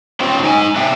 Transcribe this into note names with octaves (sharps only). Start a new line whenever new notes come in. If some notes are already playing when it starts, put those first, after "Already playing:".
C#4 F4 C5 G5
D#4 G5 G#5
D4 E5 G5